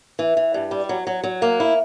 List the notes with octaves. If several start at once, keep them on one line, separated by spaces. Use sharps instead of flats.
E3
E3
G2
G3
F#3
F#3
F#3
A#3
E4